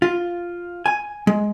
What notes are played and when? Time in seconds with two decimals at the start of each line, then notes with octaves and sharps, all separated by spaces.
0.02 F4
0.86 G#5
1.27 G#3